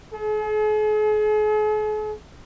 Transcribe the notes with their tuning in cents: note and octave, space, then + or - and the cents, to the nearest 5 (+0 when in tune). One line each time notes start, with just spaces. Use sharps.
G#4 +45